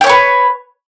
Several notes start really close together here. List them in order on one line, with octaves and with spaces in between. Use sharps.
G5 C#5 C#6 B4